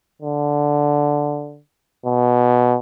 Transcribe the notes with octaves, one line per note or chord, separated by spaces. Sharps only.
D3
B2